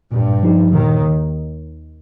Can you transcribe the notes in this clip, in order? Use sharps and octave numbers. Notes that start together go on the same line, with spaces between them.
G2 A#2
F3 D#4 G4
D#2 A#2 D#3